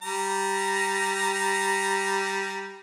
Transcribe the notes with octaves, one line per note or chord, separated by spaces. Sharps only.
G3 A#5